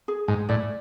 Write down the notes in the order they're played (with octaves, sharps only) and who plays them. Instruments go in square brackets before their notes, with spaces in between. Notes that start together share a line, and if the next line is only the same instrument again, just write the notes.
[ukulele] G#4
[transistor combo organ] G#2 [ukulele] G#5
[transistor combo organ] A2 [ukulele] D5